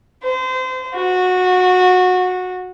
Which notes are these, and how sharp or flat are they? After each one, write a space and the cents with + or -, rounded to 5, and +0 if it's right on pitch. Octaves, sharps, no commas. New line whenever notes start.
C5 -30
F#4 -20